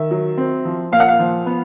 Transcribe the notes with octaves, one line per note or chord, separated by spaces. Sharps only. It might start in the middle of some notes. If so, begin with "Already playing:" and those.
Already playing: D#3 E5
F#3
C4
F3
A#2 F5
F#5
F5
F3
B3